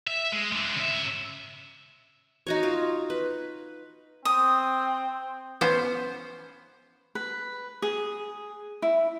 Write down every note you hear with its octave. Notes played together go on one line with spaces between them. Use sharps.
E5
G#3
G#3 D4
C#3 E5
D#4 F#4 C#5
F4 F5
B4
C4 D#6
B3 C#4 C5
B4
G#4
E4